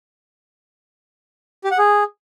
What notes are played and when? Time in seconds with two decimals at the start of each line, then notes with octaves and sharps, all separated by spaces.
1.64 G4
1.71 F#5
1.78 G#4